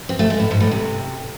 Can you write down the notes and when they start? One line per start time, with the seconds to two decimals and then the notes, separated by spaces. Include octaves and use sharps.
0.09 C4
0.19 A3
0.30 G#3
0.40 A2
0.51 G#2
0.60 A2
0.71 C3